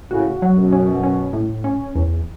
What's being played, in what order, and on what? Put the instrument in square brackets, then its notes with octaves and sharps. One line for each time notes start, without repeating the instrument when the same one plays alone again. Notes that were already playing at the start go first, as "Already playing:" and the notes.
[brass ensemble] A2 C#3 [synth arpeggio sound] F#4
[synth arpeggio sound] F#3
[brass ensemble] F#2 B2
[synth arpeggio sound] C#4
C#4
A2
C#4
E2